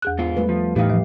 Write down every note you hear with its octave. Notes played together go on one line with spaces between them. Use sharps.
E2 G#4 F#6
G#2 B3 F4
G3 A3 B4
F3
A2 E3 D#4 G4 F5
F3